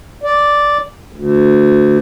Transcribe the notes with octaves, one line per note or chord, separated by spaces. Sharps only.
D5
D2